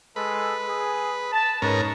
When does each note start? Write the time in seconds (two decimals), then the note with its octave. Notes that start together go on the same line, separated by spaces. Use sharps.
0.16 G#3 A4 B4
0.67 G#4
1.32 A5
1.62 G#2 C#4 D#4 A#4 B4